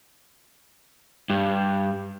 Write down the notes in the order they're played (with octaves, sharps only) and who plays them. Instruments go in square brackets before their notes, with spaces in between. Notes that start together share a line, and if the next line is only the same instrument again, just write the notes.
[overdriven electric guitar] G2